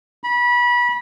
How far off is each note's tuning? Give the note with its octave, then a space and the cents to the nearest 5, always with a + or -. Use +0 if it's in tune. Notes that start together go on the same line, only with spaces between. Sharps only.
B5 -25